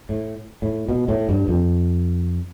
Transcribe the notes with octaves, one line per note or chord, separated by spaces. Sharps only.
A2
A2
B2
A2
G2
F2